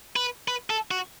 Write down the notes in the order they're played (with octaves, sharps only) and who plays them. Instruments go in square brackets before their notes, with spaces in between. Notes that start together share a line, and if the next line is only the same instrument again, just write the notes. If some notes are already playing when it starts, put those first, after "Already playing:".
[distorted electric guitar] B4
B4
A4
F#4